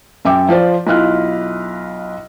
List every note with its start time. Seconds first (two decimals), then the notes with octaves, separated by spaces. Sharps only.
0.25 F#2 E5 G5 D6
0.49 F3 F4 C5 D5
0.87 B1 E4 F4 F6 F#6